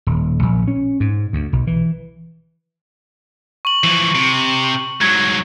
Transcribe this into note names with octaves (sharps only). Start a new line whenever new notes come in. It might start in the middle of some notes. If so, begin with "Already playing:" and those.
D#1
A#1
C#4
G#2
D2
B1
E3
C#6 F#7
E3 F3
C3
G#2 F#3 G#6